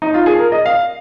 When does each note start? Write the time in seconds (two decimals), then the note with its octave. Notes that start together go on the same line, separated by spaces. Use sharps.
0.02 D#4
0.14 F4
0.26 G#4
0.39 A#4
0.52 D#5
0.66 F5